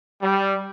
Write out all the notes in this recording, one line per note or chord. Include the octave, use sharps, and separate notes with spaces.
G3